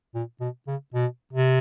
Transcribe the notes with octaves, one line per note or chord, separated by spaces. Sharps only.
A#2
B2
C#3
B2
C3